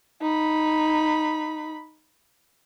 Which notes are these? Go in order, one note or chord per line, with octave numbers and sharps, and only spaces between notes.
D#4 B5